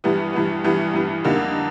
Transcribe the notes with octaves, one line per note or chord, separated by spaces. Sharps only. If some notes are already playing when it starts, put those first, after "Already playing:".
G2 E3 G3 B3
G2 E3 G3 B3
G2 E3 G3 B3
G2 E3 G3 B3
F2 D3 G3 A#3 D#4